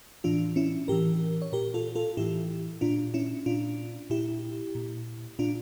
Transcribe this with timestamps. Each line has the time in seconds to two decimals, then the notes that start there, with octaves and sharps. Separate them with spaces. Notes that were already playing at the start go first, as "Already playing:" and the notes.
0.24 A2 E3 D4 F4
0.56 C#4 E4
0.88 A2 E3 G4 A#4
1.42 C#5
1.52 A#2 G4 A#4
1.74 F4 A4
1.95 F4 A4
2.17 A2 E3 E4 G4
2.81 A#2 D4 F4
3.14 C#4 E4
3.46 A#2 D4 F4
4.10 A#2 E4 G4
4.75 A#2
5.39 A#2 D4 F4